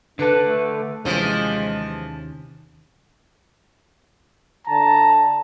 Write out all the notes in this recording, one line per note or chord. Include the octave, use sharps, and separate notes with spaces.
D3 D4 A4 B4
A3
D#2 C3 E3 F3 G#3 C#4
D3 A5 A#5